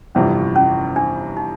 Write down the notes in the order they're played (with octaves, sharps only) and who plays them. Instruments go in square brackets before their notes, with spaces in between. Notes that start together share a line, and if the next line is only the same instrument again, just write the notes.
[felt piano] G1 F2 C3 E3 G3 [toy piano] C#4
[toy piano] C#4
D4
D#4